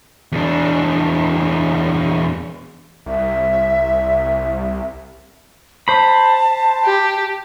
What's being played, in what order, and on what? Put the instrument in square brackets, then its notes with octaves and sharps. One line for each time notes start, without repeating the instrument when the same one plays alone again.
[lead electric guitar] E2 D4
[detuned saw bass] C2 [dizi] E5
[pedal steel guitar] C5 B5 [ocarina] A5
[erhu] G4